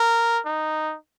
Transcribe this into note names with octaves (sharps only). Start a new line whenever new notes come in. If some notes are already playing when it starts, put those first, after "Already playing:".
Already playing: A#4
D#4